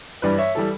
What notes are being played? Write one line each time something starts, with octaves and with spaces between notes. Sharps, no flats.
G2 E3 G3 B4 D5
C#5 E5
E3 G3 A4